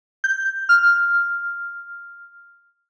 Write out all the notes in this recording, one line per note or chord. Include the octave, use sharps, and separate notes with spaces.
G6
F6